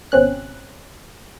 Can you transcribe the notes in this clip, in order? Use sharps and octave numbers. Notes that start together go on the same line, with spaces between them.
G#1 B2 C4 C#4 F#6